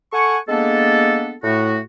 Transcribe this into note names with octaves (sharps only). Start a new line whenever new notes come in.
A4 F#5 G#5 C#6
G#3 A#3 B3 D4 A4
A2 A3 F#4